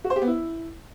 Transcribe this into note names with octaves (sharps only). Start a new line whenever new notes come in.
F#4
C5
G4
B3
E4